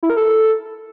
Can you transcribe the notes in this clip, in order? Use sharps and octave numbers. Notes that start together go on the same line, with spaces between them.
E4
A#4
A4